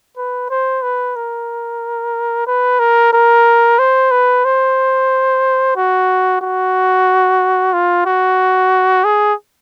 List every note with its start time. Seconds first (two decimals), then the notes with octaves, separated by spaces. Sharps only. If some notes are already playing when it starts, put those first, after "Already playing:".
0.17 B4
0.50 C5
0.82 B4
1.16 A#4
2.47 B4
2.79 A#4
3.13 A#4
3.79 C5
4.11 B4
4.45 C5
5.76 F#4
6.41 F#4
7.73 F4
8.06 F#4
9.05 G#4